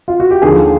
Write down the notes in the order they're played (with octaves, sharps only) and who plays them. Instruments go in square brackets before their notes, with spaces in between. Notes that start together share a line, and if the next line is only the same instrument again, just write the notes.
[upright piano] F4
F#4
G4
D#2 D3 F3 G#4